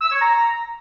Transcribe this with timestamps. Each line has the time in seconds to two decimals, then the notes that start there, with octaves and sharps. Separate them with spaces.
0.02 E6
0.12 C#5
0.22 A#5